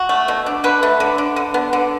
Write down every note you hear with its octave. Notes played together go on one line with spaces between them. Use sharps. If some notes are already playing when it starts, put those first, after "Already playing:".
Already playing: F#4
A3
B2
D4
D3 B4
A3
D3
D4
D3
B3
D3